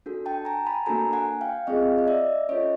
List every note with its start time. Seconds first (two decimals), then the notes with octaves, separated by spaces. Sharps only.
0.06 D4 F#4 A4
0.26 G5 A5
0.45 G#5 A#5
0.67 A5 B5
0.86 A#3 D4 F#4 A4 G#5 A#5
1.13 F#5 G#5
1.41 F5 G5
1.67 C4 F4 G#4 D#5 F5
1.98 D#5
2.08 D5 E5
2.49 C#4 F4 A4 C#5 D#5